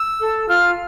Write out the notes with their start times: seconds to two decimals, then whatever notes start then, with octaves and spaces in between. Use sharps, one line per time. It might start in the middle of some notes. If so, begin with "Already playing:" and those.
Already playing: E6
0.20 A4
0.48 F4 F6